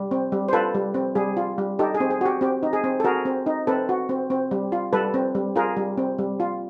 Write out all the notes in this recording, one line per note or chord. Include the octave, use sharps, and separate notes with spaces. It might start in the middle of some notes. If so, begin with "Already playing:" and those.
Already playing: G3
C4
G3
C5
F4 A4 B4
G3
C4
G3 G#4
F4
G3
D#4 G4 A4
G#4
C4
G#4
F#4 G4
C4 G4
D#4
G#4
C4
A4
F#4 G#4 A#4
C4
D#4
C4 A4 B4
F#4
C4
C4
G3
F4
G3 A4 B4
C4
G3
F4 G#4 A#4
G3
C4
G3
F4